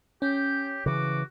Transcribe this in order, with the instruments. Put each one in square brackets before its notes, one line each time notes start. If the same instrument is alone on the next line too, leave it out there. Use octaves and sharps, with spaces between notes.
[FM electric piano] C#4 [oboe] G4 [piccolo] G6
[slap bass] C#3 E3 [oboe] F#4 [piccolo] D6